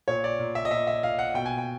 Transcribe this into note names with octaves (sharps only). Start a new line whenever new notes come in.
A#2 C#5
D5
A#2
E5
D#5
A#2 E5
E5
A#2 F5
F#5
B2 G5
G#5
G5